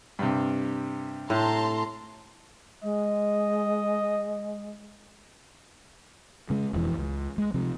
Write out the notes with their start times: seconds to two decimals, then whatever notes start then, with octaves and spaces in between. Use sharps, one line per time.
0.19 G2 C3
1.30 A2 A5 A#5 C6
2.83 G#3 D#5
6.50 C#3 G#3
6.73 E1 F2 E3
6.97 C#2
7.38 G#3
7.54 C3 F3